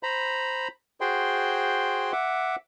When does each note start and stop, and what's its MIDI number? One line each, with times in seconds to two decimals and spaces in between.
0.03 0.68 72
0.03 0.68 82
0.03 0.68 83
1.01 2.12 66
1.01 2.12 68
1.01 2.12 72
1.01 2.12 79
1.01 2.12 84
2.12 2.56 76
2.12 2.56 78
2.12 2.56 86